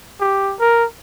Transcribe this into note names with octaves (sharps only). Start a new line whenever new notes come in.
G4
A#4